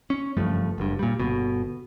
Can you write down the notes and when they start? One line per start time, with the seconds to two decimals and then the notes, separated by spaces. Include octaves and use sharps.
0.10 C#4
0.37 F#1 G2 F3 A3
0.78 F#1 G2
0.99 A#2 G3
1.20 G1 B2